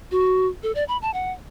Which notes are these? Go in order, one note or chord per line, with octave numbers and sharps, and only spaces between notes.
F#4
A4
D5
B5
A5
F#5